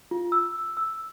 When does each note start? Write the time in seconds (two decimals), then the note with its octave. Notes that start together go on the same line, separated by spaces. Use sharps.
0.11 F4
0.32 E6
0.77 E6